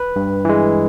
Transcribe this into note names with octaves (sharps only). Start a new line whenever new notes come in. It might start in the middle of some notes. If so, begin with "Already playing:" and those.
Already playing: B4
G2
E3 G#3